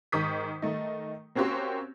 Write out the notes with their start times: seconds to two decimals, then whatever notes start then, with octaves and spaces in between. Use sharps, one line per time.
0.12 G#2 D#3 C#6 D#6 G6 B6
0.62 D#3 A3 D#4
1.35 A#3 C4 C#4 F#4 G4 C5